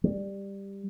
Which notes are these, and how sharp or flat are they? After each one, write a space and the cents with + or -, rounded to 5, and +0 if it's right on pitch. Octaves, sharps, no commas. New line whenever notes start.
G3 +10